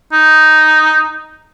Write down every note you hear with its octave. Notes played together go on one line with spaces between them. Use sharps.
D#4